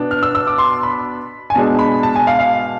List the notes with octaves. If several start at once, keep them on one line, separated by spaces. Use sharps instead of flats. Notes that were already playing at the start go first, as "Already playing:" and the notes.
Already playing: B2 B3 D4
F6
E6
E6
D6
C6
B5
G#5
B2 G#3 D4 A5
B5
A5
G#5
F5
F5